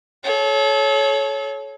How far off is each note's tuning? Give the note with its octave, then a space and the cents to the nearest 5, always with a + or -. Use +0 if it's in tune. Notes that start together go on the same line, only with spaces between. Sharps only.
A4 -35 C#5 +0